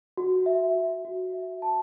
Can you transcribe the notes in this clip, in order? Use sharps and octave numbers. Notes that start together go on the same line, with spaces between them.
F#4
E5
F#4
F#4
E5
A5